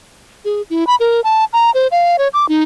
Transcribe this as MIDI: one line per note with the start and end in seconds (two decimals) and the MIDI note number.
0.45 0.62 68
0.70 0.87 64
0.87 0.95 83
1.00 1.21 70
1.24 1.45 81
1.53 1.71 82
1.74 1.87 72
1.91 2.16 77
2.19 2.28 73
2.34 2.48 86
2.49 2.63 63